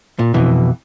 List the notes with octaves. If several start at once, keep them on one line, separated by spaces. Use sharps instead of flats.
A#2
F2 B2 E3